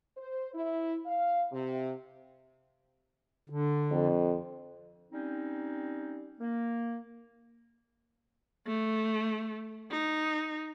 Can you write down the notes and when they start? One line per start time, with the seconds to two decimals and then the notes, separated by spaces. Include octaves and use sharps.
0.18 C5
0.54 E4
1.06 F5
1.52 C3
3.50 D3
3.91 F2
5.12 G3 C4 C#4 D#4
6.39 A#3
8.67 A3
9.91 D#4